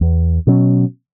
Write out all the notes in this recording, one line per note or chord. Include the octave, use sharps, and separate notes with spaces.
E2
B2 F#3 C#4